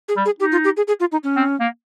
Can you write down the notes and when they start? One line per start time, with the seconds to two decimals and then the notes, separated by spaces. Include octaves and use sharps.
0.08 G#4
0.17 G3
0.25 G#4
0.40 D#4 G4
0.52 F4
0.64 G4
0.77 G#4
0.88 G#4
1.00 F4
1.12 D#4
1.24 C#4
1.36 C4
1.60 A#3